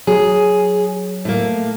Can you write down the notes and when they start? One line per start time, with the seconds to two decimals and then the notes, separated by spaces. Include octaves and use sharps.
0.07 F#3 G#4
1.25 A2 A#3